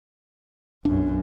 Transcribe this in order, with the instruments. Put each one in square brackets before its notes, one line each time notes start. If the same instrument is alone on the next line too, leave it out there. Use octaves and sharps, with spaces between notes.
[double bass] B1 F#2 [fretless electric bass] D4